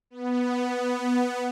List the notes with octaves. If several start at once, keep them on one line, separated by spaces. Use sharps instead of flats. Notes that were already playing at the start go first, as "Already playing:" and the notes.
B3